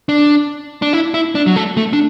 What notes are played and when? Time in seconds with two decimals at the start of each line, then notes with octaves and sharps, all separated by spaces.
0.09 D4
0.82 D4
0.93 E4
1.14 E4
1.35 D4
1.46 F#3
1.56 A3
1.77 A3
1.93 D4